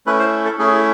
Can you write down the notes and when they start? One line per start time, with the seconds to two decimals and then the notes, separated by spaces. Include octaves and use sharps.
0.06 A3 C#4 E4 B4
0.19 C5
0.45 A4
0.59 A3 C#4 E4 G#4